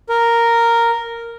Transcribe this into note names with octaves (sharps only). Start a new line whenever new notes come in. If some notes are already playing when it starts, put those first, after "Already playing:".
A#4